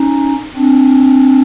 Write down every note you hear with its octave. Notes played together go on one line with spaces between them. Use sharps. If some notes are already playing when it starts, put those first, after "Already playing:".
Already playing: C#4 D#4
C4 D4